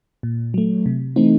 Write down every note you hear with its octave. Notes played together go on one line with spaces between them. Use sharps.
A#2
F#3 A3
C3
E3 A3 C4 D#4